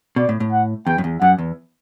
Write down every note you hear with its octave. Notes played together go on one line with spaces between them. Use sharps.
B2 D5
A2
A2
F#5
E2 G5
F#2
E2
F#2 F#5
E2